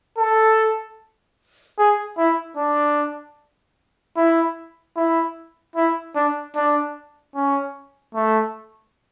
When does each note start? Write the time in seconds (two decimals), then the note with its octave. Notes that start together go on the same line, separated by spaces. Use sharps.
0.18 A4
1.79 G#4
2.18 E4
2.57 D4
4.17 E4
4.96 E4
5.76 E4
6.15 D4
6.55 D4
7.35 C#4
8.15 A3